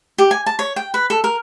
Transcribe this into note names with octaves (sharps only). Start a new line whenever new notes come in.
G4
G#5
A5
C#5
G5
B4
A4
A#4